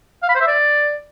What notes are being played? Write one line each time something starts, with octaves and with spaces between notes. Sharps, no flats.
F5
B5
C5
E5
D5